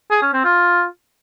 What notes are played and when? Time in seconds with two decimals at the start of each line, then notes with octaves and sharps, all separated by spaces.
0.11 G#4
0.22 C#4
0.33 C4
0.44 F4